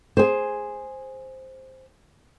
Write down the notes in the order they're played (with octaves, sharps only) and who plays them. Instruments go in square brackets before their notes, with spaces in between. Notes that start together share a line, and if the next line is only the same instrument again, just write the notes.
[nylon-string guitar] G#4 C5